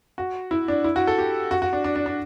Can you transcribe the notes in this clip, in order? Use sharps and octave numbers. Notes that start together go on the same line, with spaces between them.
F#4
E4
D4
E4
F#4
A4
G4
F#4
F#4
D4
D4
D4
D4